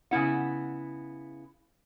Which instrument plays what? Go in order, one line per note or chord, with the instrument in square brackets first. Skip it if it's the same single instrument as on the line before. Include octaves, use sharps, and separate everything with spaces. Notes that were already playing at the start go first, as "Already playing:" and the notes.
[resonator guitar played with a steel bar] C#3 B3 E4 F#5